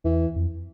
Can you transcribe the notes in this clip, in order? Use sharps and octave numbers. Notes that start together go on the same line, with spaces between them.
E2 E3
F2